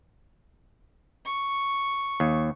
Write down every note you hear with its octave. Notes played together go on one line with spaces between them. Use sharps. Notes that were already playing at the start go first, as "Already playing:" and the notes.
C#6
D#2